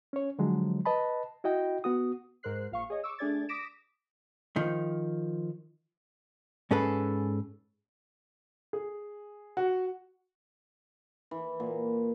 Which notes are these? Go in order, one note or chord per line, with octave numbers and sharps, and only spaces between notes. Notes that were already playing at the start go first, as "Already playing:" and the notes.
C#4 C#5
D3 F3 F#3 G#3
B4 D#5 A5 B5
E4 F#4 D#5 G5
B3 F#4 D#6
G#2 A#4 C5 F#6 C7
A#1 F5 C#6
G#4 C#5 D#5
C#6 D6 E6
A3 D4 G#4 D5 G#6 A6
D6 D#6 A#6 B6 D7 E7
D#3 F3
G#2 C#4 G#4 A4 B4
G#4
F#4
E3
A#2